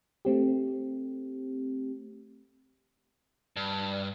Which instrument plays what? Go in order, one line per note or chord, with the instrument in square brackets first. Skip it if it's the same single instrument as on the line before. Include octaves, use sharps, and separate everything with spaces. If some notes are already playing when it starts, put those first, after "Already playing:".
[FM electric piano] A3 C4 G4
[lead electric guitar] G2